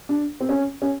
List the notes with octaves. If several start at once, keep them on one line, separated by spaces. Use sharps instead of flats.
D4
C4
C#4
C#4